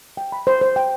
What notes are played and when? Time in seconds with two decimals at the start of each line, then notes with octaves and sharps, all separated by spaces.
0.17 G5
0.32 B5
0.47 C5
0.61 C5
0.76 G5